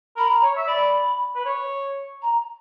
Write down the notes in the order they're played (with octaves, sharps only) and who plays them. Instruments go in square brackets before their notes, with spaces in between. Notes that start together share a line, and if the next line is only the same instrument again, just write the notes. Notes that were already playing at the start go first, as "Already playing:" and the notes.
[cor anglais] A#4 [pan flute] B5
[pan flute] A#5
[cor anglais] C#5
E5
[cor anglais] D5 [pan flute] B5
[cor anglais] B4
C#5
[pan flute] A#5